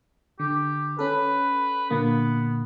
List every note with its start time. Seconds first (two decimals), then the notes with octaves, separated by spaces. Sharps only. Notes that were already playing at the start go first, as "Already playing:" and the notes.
0.39 D3 G4
0.99 C#4 A4 B4
1.90 A#2 D3 A#3 B3